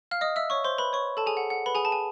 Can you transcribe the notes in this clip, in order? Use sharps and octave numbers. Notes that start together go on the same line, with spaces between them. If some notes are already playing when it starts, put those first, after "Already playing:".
F5 F6
D#5 D#6
E5 E6
C#5 C#6
C5 C6
B4 B5
C#5 C#6
A4 A5
G#4 G#5
F#5
F#5
B4 B5
G#4 G#5
A5
G#5